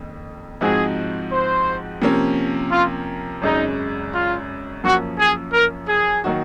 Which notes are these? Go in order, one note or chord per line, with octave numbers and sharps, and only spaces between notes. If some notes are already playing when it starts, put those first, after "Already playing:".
Already playing: F#1 F2 D#3
G#2 F3 C4 D#4 F#4 G#4
C5
C3 F3 A#3 C#4
F4
G#1 F#2 C#3 G#3 D#4
F4
F#2 F3 A#3 C#4 F#4
G#4
A#4
G#4
D#3 F#3 A#3 D#4 F#4